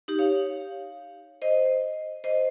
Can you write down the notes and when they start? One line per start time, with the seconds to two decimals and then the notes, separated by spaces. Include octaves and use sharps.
0.08 D#4 G4
0.19 C#5 F5
1.42 C5 D#5
2.24 C5 D#5